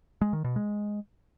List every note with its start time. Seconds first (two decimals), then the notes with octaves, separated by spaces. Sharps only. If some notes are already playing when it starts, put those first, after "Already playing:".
0.21 G#3
0.33 D#3
0.44 B2
0.56 G#3